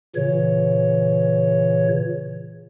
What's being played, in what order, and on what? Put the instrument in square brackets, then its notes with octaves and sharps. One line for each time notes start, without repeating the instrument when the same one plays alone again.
[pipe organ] A#2 C#3 E3 C#5